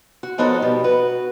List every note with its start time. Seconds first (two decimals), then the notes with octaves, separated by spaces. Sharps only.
0.23 F#4
0.38 F3 B3 D#4 F#4 A4 C#5
0.62 B2 G3 B3 G4
0.84 F#4 B4